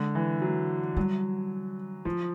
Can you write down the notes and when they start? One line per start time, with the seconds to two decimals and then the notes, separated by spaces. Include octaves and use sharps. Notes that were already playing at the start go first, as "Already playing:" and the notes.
Already playing: D3 G#3
0.15 E3
0.42 F#3
0.97 F#3 G3
2.05 F3 F#3